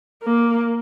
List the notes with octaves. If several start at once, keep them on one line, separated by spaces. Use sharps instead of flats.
A#3